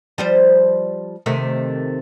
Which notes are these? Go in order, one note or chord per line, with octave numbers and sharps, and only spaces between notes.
F3 G3 C5
C3 D#3 A3